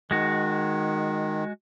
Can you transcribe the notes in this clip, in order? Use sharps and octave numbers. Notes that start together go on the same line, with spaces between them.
D#3 G#3 F#4